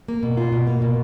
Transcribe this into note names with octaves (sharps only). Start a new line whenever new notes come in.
A#3
B2
F4
B2
A#3
B2